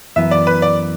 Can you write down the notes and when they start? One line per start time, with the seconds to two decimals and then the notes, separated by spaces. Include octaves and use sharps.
0.16 F#2 E3 B3 E5
0.31 D5
0.47 B4
0.62 D5